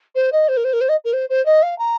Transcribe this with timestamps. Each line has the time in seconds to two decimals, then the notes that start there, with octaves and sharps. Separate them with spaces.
0.15 C5
0.32 D#5
0.48 C5
0.57 A#4
0.64 C5
0.73 A#4
0.81 C5
0.89 D#5
1.04 A#4
1.13 C5
1.29 C5
1.46 D#5
1.62 F5
1.78 A#5